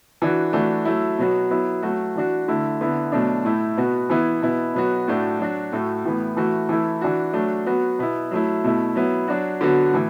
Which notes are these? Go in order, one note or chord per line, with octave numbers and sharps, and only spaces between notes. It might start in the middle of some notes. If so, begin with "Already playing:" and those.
E3 D4 F#4
E3 A3 D4 F#4
F#3 A3 E4
B2 F#3 B3 F#4
F#3 B3 E4
F#3 A3 F#4
E3 D4 F#4
D3 A3 E4
D3 B3 E4
B2 F#3 A3 D4
A2 A3 E4
B2 B3 F#4
E3 B3 E4
B2 B3 E4
B2 F#3 B3 F#4
A2 A3 D4 F#4
F#3 D4 F#4
A2 A3 F#4
A2 E3 B3
E3 A3 F#4
E3 A3 E4
E3 D4 F#4
F#3 A3 D4 F#4
F#3 B3 F#4
B2 B3 E4
F#3 A3 E4
B2 A3 E4
F#3 B3 E4
F#3 D4 F#4
D3 F#3 B3 F#4
A2 E3